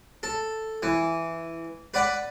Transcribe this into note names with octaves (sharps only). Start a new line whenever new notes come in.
A4
E3
B4 D5 F#5 B5